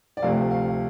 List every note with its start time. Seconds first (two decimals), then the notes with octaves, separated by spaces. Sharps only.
0.17 D5
0.22 D2 C3 F3 A3 F5
0.51 F5